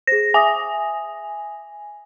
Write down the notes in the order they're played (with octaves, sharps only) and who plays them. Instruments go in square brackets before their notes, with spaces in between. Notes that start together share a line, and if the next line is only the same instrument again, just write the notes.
[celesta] G#4 C5 [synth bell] A#6
[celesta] E5 D#6 A#6 [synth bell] G#5